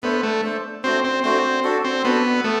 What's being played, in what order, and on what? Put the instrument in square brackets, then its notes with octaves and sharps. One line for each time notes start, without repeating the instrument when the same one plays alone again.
[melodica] A3 D4 A4 C5 [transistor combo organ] B3
[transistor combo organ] A3
[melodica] A3 D4 A4 C5
[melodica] A3 D4 F#4 C5 [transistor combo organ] C4
[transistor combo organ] C4
[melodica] A3 D4 F#4 C5 [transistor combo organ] C4
[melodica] D4 F#4 A4
[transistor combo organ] C4
[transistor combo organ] B3 [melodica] D4 F#4 A4
[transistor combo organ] A3 [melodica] B3